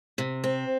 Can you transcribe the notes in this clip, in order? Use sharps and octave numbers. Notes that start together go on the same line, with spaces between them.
C3
C4